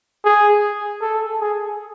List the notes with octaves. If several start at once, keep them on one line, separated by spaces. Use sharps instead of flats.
G#4
A4
G#4